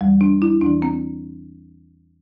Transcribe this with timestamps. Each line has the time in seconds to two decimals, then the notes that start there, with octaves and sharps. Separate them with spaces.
0.01 E2 E3 G3
0.21 D4
0.42 E4
0.61 E2 E3 D4
0.82 C4